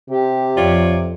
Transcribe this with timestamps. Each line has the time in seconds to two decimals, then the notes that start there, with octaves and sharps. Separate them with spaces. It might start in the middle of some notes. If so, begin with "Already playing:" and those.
0.10 C3 G4
0.57 F2 F4 C#5 D5